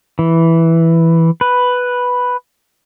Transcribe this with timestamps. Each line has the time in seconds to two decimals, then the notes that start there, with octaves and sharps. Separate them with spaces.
0.19 E3
1.41 B4